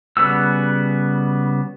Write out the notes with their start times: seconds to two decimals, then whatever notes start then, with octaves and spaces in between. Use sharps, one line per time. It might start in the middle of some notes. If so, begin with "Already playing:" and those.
0.17 C#3 G3 B3 F#4 E6